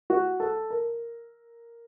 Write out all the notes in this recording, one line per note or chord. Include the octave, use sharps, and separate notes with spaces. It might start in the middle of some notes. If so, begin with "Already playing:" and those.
F#4
A4
A#4